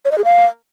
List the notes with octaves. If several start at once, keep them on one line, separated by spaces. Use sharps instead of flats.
C#5
D#5
G#4
F5